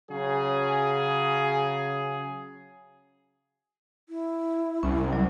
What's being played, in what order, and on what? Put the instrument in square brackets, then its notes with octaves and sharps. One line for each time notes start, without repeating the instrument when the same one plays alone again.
[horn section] C#3 F#3 G#4
[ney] E4
[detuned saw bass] C2 [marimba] C#4
[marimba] F#3